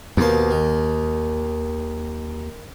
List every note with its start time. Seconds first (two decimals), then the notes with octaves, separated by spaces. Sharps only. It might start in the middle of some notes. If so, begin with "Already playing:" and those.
0.17 D#2 B2 A#3 C5
0.50 D#3